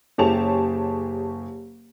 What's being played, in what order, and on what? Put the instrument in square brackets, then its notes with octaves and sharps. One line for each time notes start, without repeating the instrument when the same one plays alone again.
[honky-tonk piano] F#1 G4 G#4 C#5 A5 F7